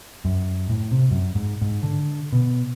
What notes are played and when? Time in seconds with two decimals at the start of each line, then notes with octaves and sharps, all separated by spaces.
0.25 F#2
0.69 A2
0.91 C3
1.11 F#2
1.35 G#2
1.62 G#2
1.83 D3
2.33 B2